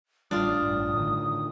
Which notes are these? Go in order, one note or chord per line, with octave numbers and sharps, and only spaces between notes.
A1 G3 D4 F4 D#6
A1 G2
A2 D3 D#3